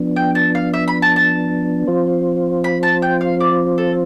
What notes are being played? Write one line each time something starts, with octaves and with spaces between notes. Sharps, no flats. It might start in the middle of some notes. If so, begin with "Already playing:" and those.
Already playing: F3 B3 D4
G5
A5
F5
E5
B5
A5
A5
F3 C4 F4 C5
B5
A5
G5
F5
D5
A4